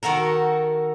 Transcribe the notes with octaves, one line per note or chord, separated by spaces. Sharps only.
D#3 F#4 A4 A#4